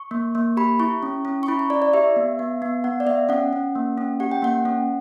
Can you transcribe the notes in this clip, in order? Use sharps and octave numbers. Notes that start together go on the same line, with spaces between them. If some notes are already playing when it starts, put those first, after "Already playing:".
Already playing: C#6
A#3
A#3
G4 B5
E4 C#6
C#4
C#4
C#6
E4 B5
C#6
E4 D5
D5
G4 E5
B3
B3
B3
B3 F#5
D5
B3 E5
C#4 F#5
C#4
A#3
C#4
G4 F#5
G5
A#3 F#5
C#4